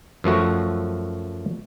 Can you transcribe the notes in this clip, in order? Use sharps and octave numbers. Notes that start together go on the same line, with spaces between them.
F#2 F3 A3 F#4